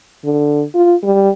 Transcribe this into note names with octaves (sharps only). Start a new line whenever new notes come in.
D3
F4
G3